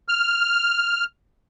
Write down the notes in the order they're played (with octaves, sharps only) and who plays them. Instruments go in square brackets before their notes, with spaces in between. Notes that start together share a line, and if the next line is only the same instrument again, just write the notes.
[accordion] F6